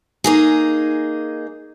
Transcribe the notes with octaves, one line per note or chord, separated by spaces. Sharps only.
A#3 D#4 G#4